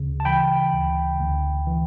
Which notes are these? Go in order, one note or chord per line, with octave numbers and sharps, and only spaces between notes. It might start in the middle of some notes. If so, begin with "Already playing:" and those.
Already playing: D2 C#3
A5
E3 G5 B5
D2
D2
E3